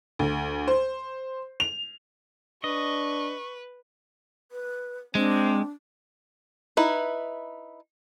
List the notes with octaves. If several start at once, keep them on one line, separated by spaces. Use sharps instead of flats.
D2
C5
F7
D4 B4 D#5 C#6
B4
G#3 C4 D4
D#4 E4 B4